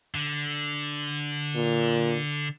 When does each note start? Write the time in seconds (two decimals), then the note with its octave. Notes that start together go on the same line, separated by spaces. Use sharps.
0.15 D3
1.56 A#2